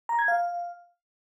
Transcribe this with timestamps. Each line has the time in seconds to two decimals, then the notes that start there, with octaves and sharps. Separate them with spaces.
0.09 A#5
0.19 G#6
0.28 F5